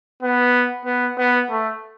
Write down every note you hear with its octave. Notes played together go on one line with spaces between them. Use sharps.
B3
B3
B3
A3